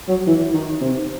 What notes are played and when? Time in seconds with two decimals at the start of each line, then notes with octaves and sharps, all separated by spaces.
0.08 F#3
0.27 E3
0.54 D#3
0.81 C3